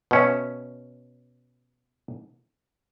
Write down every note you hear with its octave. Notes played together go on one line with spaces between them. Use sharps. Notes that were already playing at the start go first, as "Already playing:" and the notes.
B2 C#4 E5